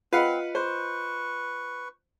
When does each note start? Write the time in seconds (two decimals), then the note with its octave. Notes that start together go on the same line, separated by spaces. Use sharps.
0.13 C4 F4 B4 D#5 F5 F#5
0.55 B4 C5 C#6